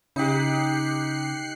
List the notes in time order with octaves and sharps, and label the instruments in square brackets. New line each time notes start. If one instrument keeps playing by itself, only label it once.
[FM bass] C#3 [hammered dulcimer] D#4 G4 [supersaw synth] F#6 C7 C#7